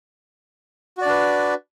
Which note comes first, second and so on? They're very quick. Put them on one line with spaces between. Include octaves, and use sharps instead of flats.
F#4 D5 D4 B4